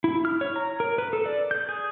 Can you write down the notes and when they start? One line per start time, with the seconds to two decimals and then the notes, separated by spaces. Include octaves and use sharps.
0.04 E4
0.25 F6
0.41 C#5
0.56 A#5
0.80 A#4
0.98 B4
1.13 A4
1.26 D5
1.51 G6
1.69 G#4